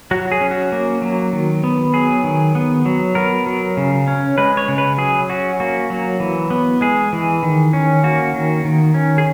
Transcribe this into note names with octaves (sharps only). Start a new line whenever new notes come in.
F#3 F#4
G#4
C#4
F#4
A#3
F#3
D#3
B3
F#3 G#4
D#3
B3
F#3
B3 A#4
F#3
C#3
C#4
G#3 B4
C#5
C#3
B4
F#3 G#4
C#4 F#4
A#3 F#4
F#3
E3
B3
G#3 G#4
E3
D#3
C#4
A#3 F#4
D#3
D#3
C#4
G#4